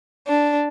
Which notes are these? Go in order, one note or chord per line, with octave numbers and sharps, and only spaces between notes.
D4